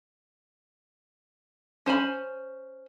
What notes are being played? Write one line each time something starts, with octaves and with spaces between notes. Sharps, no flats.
C#4 C5 G#5 B5